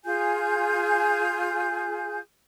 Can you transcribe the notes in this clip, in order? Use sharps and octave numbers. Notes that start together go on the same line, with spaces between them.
F4 G#4 G#5 G6